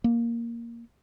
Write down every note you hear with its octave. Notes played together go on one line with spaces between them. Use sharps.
A#3